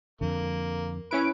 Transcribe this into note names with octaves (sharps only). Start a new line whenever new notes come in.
F2 D3 A#3
C#4 E4 B4 D7